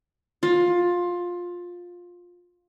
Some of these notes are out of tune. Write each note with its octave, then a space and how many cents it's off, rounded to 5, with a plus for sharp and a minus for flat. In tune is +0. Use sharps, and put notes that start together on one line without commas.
F4 +15